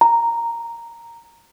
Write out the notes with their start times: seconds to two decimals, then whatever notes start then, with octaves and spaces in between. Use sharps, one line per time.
0.01 A#5